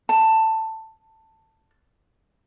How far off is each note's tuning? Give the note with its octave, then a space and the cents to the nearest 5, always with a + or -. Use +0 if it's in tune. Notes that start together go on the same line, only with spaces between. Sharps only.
A5 +15